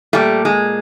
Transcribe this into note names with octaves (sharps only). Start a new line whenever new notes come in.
A#2 G3 A3
G#3